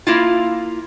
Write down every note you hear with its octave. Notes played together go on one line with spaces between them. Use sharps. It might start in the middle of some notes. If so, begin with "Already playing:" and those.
A#3 E4 F4